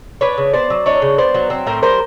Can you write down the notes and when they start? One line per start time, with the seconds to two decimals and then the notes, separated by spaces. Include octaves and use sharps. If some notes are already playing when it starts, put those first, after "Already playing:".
0.21 D4 B4 C#5
0.38 C#3
0.53 B3 C5 D5
0.70 F#3
0.86 D4 C#5 D#5
1.02 C#3
1.18 B3 C5 D5
1.35 F#3
1.50 C4
1.67 A2 A#4 C5
1.83 G3 A#4 C5